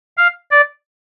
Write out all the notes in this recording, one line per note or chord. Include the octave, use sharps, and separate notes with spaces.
F5
D5